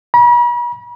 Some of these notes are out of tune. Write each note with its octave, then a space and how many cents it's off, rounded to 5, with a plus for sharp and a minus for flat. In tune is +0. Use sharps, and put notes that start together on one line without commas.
B5 -45